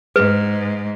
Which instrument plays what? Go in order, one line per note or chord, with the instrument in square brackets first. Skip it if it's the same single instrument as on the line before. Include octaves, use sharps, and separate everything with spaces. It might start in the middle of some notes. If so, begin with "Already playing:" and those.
[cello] G#2 [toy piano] B4